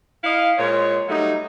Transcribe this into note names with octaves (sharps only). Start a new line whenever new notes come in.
E4 D#5 F5
A#2 G#3 C5 C#5
F#3 G3 A3 D#4